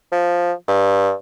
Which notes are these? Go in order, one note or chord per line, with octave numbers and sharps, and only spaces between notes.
F3
G2